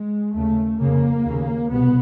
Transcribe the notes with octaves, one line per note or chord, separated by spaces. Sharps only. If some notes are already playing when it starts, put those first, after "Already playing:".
Already playing: G#3
D#2 C#3 A3
F2 C#3 A#3
D#2 C#3
C2 B2 B3